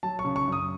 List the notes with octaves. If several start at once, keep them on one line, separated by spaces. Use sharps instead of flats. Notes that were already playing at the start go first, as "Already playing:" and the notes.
F#3 A5
C#6
C#3
C#6
F#2 D#6